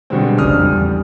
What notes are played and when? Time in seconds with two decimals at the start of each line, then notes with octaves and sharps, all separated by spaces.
0.10 B2 D3 G3 G#3 C4
0.38 F1 A#1 C#3 D4 D#6 F6
0.57 E2 G3